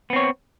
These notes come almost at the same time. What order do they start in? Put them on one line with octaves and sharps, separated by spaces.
B3 C4 C#5